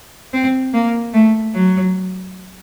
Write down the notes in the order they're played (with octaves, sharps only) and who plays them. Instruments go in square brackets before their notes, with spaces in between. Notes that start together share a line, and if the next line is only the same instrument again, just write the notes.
[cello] C4
A#3
A3
F#3